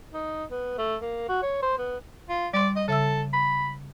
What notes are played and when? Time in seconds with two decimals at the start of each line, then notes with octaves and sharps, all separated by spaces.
0.14 D#4
0.51 B3
0.78 A3
1.01 A#3
1.29 F#4
1.42 C#5
1.63 C5
1.78 B3
2.29 F4
2.54 G3 D5 C6
2.76 D#5
2.88 C#3 A4 E5 E6
3.33 B5